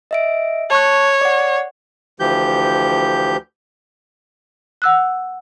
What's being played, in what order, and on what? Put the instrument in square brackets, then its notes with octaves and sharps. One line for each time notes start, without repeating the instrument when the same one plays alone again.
[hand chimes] D#5 E5 D7
[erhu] C#5 [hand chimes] A5 C#6 F#6
[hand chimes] D5 F#5
[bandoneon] D2 E3 F3 G4 G6
[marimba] F#5 E6 F#6